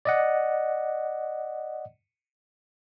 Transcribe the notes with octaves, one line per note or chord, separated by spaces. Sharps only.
D5 D#5 F#5